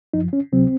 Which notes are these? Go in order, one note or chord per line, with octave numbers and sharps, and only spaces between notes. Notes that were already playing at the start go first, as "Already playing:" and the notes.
F#2 F3 D#4
C#4
C#2 C3 F#3 C4